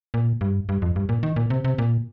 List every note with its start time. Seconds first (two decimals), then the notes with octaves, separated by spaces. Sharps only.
0.14 A#2
0.41 G2
0.69 G2
0.82 F2
0.96 G2
1.09 A#2
1.23 D#3
1.36 A#2
1.50 C3
1.64 C3
1.78 A#2